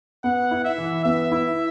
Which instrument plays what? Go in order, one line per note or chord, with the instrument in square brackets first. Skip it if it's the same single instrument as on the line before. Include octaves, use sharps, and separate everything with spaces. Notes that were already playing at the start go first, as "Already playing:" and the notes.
[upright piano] B3 [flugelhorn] F#5
[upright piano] E4
[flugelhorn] E5
[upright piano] E3
[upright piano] B3 [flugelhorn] E5
[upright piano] E4